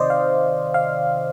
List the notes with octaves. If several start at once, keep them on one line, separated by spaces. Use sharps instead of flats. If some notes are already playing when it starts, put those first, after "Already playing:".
Already playing: C3 D#3 C5 D5 D#5
F5
F5